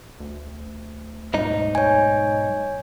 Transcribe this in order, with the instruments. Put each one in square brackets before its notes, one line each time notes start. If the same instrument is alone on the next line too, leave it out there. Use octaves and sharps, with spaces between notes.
[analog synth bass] D2
[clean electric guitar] B1 G#2 D#4
[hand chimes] C#5 G#5